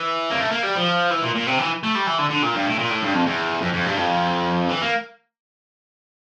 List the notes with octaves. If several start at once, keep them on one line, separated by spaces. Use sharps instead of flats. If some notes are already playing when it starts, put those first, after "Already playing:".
Already playing: E3
A#3
A3
A#3
G3
F3
E3
A#2
A#2
C3
E3
A3
G3
E3
D3
D3
A#2
G2
A2
A#2
A2
G2
F2
E2
F2
F2
G2
F2
E3
A#3